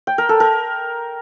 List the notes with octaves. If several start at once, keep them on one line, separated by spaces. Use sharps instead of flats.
G5
A#4
A4
A#4